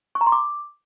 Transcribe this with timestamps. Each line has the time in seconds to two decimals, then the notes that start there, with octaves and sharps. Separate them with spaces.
0.15 C#6
0.21 A#5
0.27 C6
0.32 D6